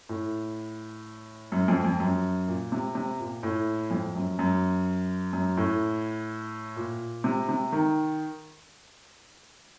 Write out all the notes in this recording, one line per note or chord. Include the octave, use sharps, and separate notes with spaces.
A2
F#2
F2
F2
F#2
A#2
C3
C3
A#2
A2
F2
F#2
F#2
F#2
A2
A#2
C3
C3
D#3